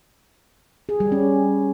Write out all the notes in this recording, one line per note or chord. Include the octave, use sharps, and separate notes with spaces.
G#4
G3
C#4